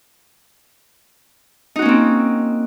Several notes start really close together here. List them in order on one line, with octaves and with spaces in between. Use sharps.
D#4 F#4 C#4 A#3 C4